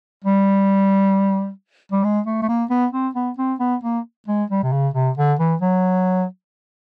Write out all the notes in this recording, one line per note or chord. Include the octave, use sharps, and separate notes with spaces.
G3
G3
G#3
A3
A3
A#3
B3
C4
B3
C4
B3
A#3
G#3
G3
C3
C#3
C3
D3
E3
F#3